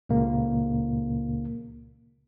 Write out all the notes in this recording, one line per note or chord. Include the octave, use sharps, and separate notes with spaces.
C#2 A#2 C#3 A#3